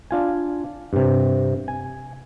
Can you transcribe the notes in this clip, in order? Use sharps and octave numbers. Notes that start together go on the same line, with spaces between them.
D4 F4 G#5
G2 C3
G#5